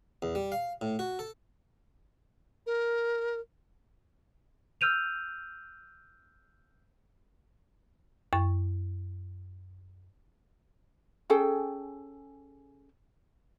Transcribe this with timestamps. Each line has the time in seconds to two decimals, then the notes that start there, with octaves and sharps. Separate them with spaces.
0.22 E2
0.35 G3
0.52 F5
0.81 A2
0.99 F#4
1.19 A4
2.66 A#4
4.81 E6 F6 G6 D#7 F7
8.33 F#2 C#6
11.30 C#4 G#4 A4 G5